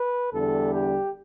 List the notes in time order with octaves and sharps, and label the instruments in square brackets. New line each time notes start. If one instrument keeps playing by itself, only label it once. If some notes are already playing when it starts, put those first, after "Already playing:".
Already playing: [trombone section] B4
E2 D3 G3 A4
G4